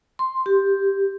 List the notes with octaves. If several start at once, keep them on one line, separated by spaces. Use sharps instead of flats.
C6
G4